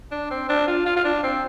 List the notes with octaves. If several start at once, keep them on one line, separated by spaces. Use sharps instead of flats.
D4
C4
D4
F4
F4
F4
D4
C4